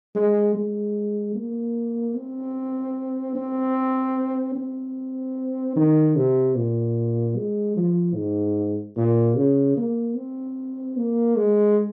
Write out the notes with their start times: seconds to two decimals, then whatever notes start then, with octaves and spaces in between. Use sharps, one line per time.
0.15 G#3
0.55 G#3
1.35 A#3
2.16 C4
3.35 C4
4.55 C4
5.76 D#3
6.16 C3
6.55 A#2
7.36 G#3
7.76 F3
8.15 G#2
8.96 A#2
9.36 C#3
9.77 A#3
10.16 C4
10.97 A#3
11.36 G#3